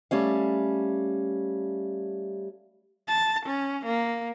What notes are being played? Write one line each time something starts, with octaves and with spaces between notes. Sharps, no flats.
G3 A3 C#4 F5
A5
C#4
A#3